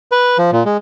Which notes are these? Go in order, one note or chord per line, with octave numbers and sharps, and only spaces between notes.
B4
F3
A#2
G#3